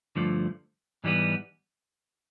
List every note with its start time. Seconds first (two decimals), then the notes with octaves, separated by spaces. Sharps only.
0.16 G2 D3 F3 A3
1.04 G#2 E3 G3 B3